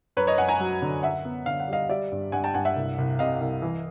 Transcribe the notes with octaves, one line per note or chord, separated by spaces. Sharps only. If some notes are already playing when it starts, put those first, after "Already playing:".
F#2 B4 C#5
C#5 D#5
F#2 F#5 G#5
G#5 A#5
F#3
D3
F#2 E5 F#5
B3
D3 F5
F#5
G3 D#5 F5
G3 D5 E5
G2
G2 F#5 G#5
G5 A5
G2 F#5 G#5
E5 F#5
C2
C2
C3 D#5 F5
C2
E3